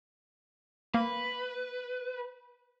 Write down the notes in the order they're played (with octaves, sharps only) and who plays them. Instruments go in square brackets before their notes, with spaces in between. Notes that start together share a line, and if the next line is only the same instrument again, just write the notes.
[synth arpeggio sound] A#3 [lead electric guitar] B4